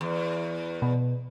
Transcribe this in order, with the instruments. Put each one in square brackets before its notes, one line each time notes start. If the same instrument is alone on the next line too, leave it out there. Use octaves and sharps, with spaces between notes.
[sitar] E2
[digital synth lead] B2